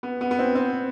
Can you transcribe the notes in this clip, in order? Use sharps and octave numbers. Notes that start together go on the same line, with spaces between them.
B3
B3
B3
C4
C4